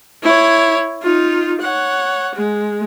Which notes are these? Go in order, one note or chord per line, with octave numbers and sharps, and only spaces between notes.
E4 C#5
D#4 F4
C#5 F#5
G#3